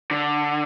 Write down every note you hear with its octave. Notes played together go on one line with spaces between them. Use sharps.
D3